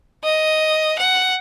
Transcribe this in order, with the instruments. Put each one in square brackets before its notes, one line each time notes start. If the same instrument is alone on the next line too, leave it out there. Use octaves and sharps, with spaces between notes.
[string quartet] D#5
F#5